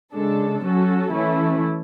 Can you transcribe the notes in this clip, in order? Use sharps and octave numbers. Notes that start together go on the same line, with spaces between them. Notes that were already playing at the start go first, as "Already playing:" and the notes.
C#3 G#3 D4 A4
F#3 C#4 F#4 A4
E3 A3 C#4 E4